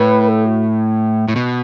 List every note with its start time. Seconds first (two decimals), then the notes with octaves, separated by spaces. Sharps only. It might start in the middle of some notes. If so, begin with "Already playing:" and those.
Already playing: A2 B4
0.28 A4
0.45 F#4
1.28 A2
1.36 B2